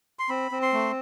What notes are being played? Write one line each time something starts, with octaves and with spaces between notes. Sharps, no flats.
C6
C4 B5
C4
C6
A3